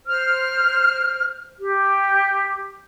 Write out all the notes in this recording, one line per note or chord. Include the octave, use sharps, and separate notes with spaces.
C5 F6
G4